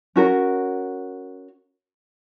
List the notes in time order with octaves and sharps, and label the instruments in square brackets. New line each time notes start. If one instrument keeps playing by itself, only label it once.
[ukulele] C#4 F#4 A#4